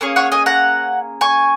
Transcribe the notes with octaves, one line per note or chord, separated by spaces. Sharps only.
A#3 C#4 G#4 C#5
C#5 F#5
D#5 G#5
F#5 A#5
G#5 C#6